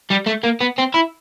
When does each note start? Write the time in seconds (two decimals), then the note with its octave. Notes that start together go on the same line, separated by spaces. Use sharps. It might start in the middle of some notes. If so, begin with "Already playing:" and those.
0.10 G3
0.26 A3
0.43 A#3
0.61 B3
0.78 C4
0.94 E4